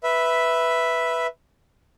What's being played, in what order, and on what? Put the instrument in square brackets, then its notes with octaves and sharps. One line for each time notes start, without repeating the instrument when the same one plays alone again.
[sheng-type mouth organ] B4 E5